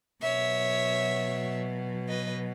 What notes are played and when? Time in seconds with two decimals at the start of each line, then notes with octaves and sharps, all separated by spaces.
0.22 B2 F#3 C#5 E5
2.08 B4 D#5